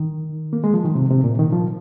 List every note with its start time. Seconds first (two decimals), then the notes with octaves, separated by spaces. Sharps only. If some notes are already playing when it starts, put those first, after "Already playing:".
Already playing: D#3
0.53 A#3
0.64 G#3
0.74 F3
0.85 D#3
0.95 C3
1.10 C3
1.24 A#2
1.39 D#3
1.53 F3